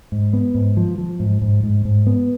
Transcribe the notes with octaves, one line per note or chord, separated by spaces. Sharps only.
G#2
B3
G#2
F3
F3
G#2
G#2
G#2
G#2
B3